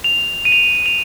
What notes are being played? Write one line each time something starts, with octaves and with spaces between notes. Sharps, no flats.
F7
D#7
F7
D#7
F7